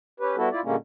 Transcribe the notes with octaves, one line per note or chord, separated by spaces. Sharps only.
C#4 G4 B4
G3 B3 E4 F#4 A4
E4 F4 D5
A#2 D3 G3 G#3 A#3 C#4